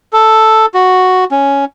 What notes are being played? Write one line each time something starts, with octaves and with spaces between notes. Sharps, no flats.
A4
F#4
C#4